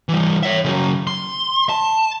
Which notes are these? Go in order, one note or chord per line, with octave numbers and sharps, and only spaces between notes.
E3 G3
C#5 E5
C#3 F#3
C6
A5